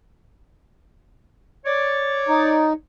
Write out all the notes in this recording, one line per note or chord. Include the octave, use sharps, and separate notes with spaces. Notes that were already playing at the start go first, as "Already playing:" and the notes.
C#5 D5
D#4